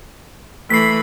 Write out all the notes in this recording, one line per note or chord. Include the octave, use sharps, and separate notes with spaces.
E3 A3 B5 B6 C7